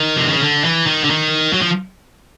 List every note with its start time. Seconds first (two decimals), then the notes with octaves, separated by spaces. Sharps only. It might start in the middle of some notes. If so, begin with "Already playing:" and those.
Already playing: D#3
0.16 C3
0.29 C#3
0.42 D3
0.64 E3
0.87 D#3
1.04 D3
1.10 D#3
1.53 F#3
1.62 F3